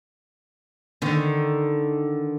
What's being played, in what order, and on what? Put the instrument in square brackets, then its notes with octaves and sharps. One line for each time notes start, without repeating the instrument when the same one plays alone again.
[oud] D3 D#3